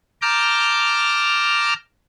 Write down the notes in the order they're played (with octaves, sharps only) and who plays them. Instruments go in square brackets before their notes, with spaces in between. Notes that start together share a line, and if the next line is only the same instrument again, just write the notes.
[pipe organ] A5 A#5 D6 F6 G6